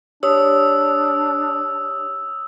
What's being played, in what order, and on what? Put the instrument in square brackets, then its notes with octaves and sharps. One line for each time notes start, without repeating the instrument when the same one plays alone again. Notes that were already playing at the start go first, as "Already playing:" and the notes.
[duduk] D4 [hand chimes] G4 C#5 [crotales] D#6 E6